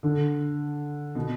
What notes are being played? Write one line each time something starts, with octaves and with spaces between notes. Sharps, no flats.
D3
B2